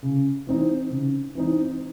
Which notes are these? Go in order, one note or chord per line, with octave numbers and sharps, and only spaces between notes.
C#3
E3 C4 D#4
C#3
E3 C4 D#4